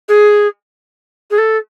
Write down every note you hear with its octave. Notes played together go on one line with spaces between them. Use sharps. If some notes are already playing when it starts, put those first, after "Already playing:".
G#4
G#4
A4